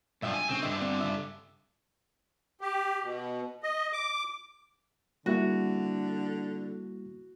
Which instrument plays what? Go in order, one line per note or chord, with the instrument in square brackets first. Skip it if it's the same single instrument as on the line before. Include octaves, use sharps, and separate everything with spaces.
[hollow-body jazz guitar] B1 E5 G5 [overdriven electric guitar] G2 F3
[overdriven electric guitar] G#5
[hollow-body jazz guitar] C2 C#3 D4 [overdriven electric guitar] C4
[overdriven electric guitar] G2 D3 [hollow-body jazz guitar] D#5 E5 C6
[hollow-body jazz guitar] C4
C#3 E5
[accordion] G4
B2
D#5
D6
[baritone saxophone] D3 [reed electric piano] G3 A#3 E4 [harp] F#4